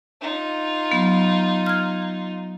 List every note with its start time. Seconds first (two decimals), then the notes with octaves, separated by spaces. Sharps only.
0.22 D#4 F4
0.92 F#3 B3
1.66 F6 G#6